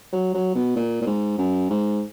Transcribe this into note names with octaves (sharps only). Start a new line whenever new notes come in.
F#3
F#3
B2
A#2
A#2
G#2
F#2
G#2